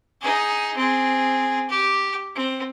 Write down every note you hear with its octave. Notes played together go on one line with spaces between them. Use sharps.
D#4 G#4
C4 G#4
G4
C4